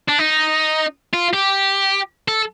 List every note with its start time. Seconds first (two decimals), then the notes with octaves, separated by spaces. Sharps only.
0.09 D4
0.19 D#4
1.14 F4
1.33 G4
2.28 A4